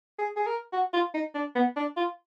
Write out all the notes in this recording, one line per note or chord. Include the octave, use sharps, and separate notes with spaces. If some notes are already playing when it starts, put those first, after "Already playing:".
G#4
G#4
A#4
F#4
F4
D#4
D4
B3
D4
F4